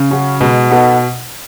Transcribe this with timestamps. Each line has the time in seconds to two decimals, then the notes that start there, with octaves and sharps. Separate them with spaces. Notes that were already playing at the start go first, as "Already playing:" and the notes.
Already playing: C#3
0.10 F#3 C#4 F#4
0.40 B2 G#3
0.71 B3 D#4 F#4 A4